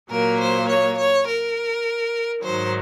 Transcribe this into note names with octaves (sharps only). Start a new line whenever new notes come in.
A#2 F#3 A#3 A#4
C5
C#5
C#5
A#4
G#2 D#3 F#3 C5